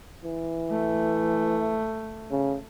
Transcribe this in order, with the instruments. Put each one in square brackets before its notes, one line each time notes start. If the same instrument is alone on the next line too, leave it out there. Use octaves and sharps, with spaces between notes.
[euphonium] E3
[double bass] A3
[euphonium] C#3